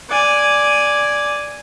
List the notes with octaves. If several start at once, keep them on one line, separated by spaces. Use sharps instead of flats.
D5 G#5